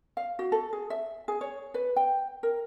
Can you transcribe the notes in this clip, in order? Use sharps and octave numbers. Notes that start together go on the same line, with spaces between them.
F5
F#4
A4
G#4
E5
G#4
C#5
B4
G5
A#4